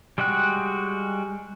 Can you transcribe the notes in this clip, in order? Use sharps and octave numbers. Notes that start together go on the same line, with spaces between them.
G3 G#3 F#4 G5 F#6